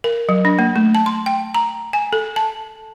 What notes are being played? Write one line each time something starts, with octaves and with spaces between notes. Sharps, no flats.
A#4
F#3
D4
A#3
A3
A5
C6
G5
A#5
G#5
A4
A5